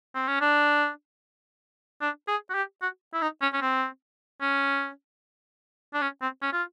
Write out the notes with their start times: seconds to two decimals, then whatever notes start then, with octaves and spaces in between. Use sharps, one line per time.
0.15 C4
0.28 C#4
0.41 D4
2.01 D4
2.28 G#4
2.50 F#4
2.54 G4
2.82 F#4
3.14 E4
3.22 D#4
3.42 C#4
3.53 C#4
3.62 C4
4.41 C#4
5.94 D4
6.02 C#4
6.22 C4
6.42 C#4
6.53 F4